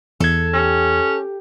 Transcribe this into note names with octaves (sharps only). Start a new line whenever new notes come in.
E2 A4 G#6
C#4 G4